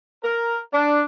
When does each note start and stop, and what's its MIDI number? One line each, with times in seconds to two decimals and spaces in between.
0.24 0.58 70
0.73 1.03 62